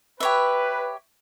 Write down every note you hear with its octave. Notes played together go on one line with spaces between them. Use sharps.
G4 B4 C#5 E5